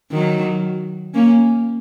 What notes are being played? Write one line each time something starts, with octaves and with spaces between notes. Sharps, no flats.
D#3 F#3
A#3 C#4